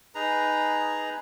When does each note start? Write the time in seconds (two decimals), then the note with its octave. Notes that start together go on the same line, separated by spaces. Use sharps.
0.15 D#4 G#4 B4 A#5